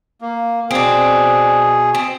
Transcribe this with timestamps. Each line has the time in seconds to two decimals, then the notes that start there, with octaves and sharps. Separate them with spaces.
0.21 A#3
0.71 B2 C4 D4 G#4
1.95 C4